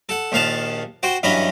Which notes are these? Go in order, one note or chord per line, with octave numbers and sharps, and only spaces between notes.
A4 F#5
A#1 D#2 F5 F#5 A5
F#4 C5 G5
G2 E3 F#3 C#4 D#5 B5